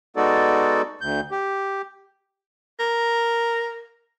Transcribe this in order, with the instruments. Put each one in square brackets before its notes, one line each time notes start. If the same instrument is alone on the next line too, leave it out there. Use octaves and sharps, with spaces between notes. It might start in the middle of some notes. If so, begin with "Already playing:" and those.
[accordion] G#3 B3 D#4 F#4 A4 D5
D2 G6
G4
[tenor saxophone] A#4